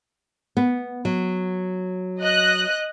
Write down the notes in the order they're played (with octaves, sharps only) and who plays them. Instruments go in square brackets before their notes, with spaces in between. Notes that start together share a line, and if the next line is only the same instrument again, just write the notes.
[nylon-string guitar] B3
F#3
[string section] D#5 F#6